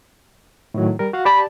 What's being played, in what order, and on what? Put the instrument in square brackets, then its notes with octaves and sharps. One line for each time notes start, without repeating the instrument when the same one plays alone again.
[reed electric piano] A2 D#3 F#3
G3 A#4
F#4 F5 F#5
[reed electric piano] G4 D5 A5 [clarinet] B5